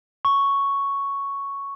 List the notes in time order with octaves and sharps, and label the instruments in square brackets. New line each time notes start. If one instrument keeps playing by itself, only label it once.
[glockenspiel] C#6